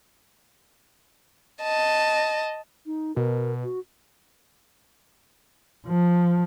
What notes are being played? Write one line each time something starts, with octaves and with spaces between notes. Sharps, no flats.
D#5 A5
D#4
B2 A#4
F#4
F3